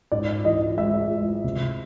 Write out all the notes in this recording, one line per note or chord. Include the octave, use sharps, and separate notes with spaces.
G#2 D5
E3 D#5
G#3 E5
G#3
C3